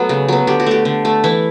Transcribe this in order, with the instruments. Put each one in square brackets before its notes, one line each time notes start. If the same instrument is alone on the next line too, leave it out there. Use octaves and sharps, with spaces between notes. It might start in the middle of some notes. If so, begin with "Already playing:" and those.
Already playing: [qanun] F#3 A3 B3
C#3
F#3 B3
D3 G4
F#4
A3 G4
D3
A3
E3 E4